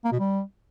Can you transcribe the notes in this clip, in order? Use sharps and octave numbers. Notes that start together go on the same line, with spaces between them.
A#3
B2
G3